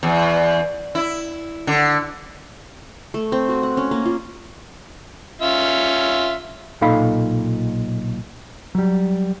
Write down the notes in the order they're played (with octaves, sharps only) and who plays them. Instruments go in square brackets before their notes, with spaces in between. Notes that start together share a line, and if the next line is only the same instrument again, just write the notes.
[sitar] E2
E4
D3
[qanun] A3
C4
F#4
F#5
C#4
A#3
F4
[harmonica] C#4 F4 E5
[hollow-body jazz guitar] B1 A#2 D#4 A4 F5 B5
F#3 G3